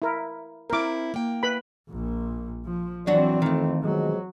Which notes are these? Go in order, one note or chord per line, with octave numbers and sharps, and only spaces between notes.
E4 A#4
C4 E4 A#4 D6
A#3 G5
B4 B5
A#1 A#2
F3
E3 F#3 C4 D4 F#4 D5
F2 D#3 A3
B2 F3 F#3 G#3